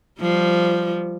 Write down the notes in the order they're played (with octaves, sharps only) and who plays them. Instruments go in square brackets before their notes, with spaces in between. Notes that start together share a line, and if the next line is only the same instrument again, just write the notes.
[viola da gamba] F3 G3